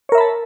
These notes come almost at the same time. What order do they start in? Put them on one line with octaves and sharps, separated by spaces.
C#5 A#4 E5 B5 A5